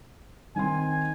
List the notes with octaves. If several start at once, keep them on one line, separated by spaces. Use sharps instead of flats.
D#3 C4 G#5 C6